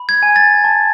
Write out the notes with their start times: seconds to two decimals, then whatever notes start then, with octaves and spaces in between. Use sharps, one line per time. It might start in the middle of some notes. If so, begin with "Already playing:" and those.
Already playing: B5
0.09 G#6
0.23 G#5
0.36 A6
0.64 A5